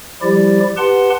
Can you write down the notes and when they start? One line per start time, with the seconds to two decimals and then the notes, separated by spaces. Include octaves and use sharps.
0.22 F3 G3 E4 G4 D5
0.77 G4 B4 F#5 A5 C6